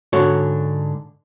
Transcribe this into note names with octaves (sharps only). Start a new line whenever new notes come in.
G#2 D3 F#4 A4 C#5